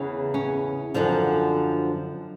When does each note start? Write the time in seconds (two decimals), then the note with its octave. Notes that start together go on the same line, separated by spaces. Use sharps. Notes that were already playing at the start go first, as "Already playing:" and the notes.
Already playing: E2 C#3 E3
0.34 C#4
0.94 F#2 D3 F3